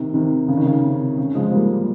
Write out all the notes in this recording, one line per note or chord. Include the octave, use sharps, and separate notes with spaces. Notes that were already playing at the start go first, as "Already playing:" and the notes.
Already playing: C3 D#3
C3 D#3
C#3
D#3
C#3
C3
C#3
F3 G#3
G3 A#3